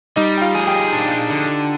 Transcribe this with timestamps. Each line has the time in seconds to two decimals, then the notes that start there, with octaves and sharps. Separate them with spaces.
0.16 G3 D#4 D#5
0.37 G5
0.41 F4 F5
0.55 G#4
0.67 G4 G5
0.93 D4
1.30 D3